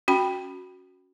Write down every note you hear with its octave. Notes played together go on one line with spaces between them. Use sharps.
C#4 F#4 G5 B5